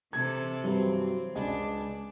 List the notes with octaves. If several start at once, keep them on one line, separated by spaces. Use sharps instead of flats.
C3 E3 A4 G#6
G2 E3 F#3 C4
C#2 D4 D#5 G#5